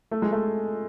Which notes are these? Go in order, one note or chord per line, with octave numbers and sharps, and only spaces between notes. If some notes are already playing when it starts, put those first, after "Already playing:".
A3
G#3
A3